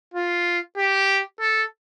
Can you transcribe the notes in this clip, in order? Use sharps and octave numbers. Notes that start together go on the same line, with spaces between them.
F4
G4
A4